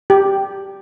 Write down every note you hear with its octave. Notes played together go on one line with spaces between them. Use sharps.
G4